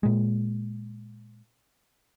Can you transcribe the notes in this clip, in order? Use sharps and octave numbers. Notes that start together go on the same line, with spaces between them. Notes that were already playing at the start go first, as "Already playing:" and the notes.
A#2 G#3